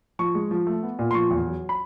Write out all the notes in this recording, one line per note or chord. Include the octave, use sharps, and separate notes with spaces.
F3 C#6
G#3
F3
A3
B3
A#2
C6
F3 C#6
E2
F#3
B5